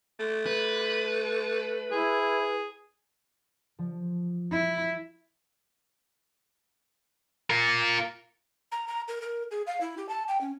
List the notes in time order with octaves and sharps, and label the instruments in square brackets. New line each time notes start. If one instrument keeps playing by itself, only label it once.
[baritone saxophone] A3
[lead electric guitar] B4
[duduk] E4 [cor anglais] G#4
[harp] F3
[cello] E4
[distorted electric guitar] F4 A#4
[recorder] A#5
A#5
A#4
A#4
G#4
F5
E4
G4
A5
G5
C#4